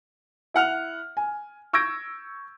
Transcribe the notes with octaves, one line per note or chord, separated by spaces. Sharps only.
E4 F#5 F6 F7
G#5
C#6 E6 G6 G#6 A#6 D7